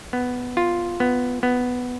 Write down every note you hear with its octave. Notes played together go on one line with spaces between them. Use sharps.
B3
F4
B3
B3